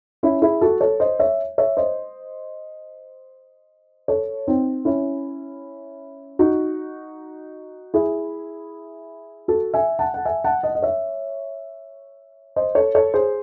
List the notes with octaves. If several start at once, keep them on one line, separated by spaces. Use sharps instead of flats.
C#4 E4
E4 G#4
F#4 A4
A4 C#5
C5 D#5
C#5 E5
C#5 E5
C5 D#5
A4 C#5
C4 D#4
C#4 E4
D#4 F#4
E4 G#4
F#4 A4
E5 G#5
F#5 A5
F#5
E5 G#5
F#5 A5
D#5 F#5
D#5
C#5 E5
C5 D#5
A4 C#5
A4 C#5
G#4 C5